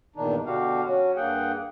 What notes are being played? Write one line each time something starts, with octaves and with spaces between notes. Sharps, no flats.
E2 G2 A#2 D#3 D4 D#4
B2 D3 F#4 G4 F5
F#3 C#4 F#4
G2 A#3 G#4 F#5 G5